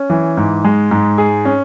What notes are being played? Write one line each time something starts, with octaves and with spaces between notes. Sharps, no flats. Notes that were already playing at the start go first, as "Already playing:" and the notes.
Already playing: C#4
E3
G#2
G#3
G#2
G#4
C#4